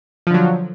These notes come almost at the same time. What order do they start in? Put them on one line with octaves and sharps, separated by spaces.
F3 D3 F#3